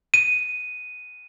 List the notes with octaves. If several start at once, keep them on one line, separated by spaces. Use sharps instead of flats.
D#7